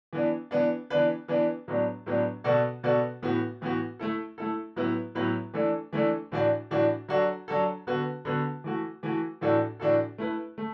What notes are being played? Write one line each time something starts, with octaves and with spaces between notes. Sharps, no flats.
E3 B3 D4
E3 B3 D4
E3 B3 D4 B4
E3 B3 D4 B4
A2 F#3 B3 D4
A2 F#3 B3 D4
B2 B3 F#4 A4 D5
B2 B3 F#4 A4 D5
A2 E3 B3 F#4
A2 E3 B3 F#4
A3 E4 A4
A3 E4 A4
A2 F#3 B3 E4 B4
A2 F#3 B3 E4 B4
E3 A3 D4 A4
E3 A3 D4 A4
A2 E3 D4 F#4 D5
A2 E3 D4 F#4 D5
F#3 D4 F#4 A4
F#3 D4 F#4 A4
D3 B3 F#4 B4
D3 B3 F#4 B4
E3 A3 F#4
E3 A3 F#4
A2 E3 D4 F#4 A4
A2 E3 D4 F#4 A4
A3 E4 B4
A3